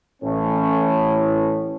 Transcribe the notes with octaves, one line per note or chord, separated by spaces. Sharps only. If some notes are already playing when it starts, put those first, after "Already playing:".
A1 A2 C#4